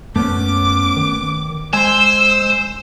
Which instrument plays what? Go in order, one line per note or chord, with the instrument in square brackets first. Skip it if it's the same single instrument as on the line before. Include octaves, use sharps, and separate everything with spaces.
[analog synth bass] F#2 [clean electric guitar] A3 B3 C#4 [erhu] D6
[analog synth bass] D#3
[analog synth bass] G#3 [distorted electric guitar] C5 [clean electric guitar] G#5 C6 [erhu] E6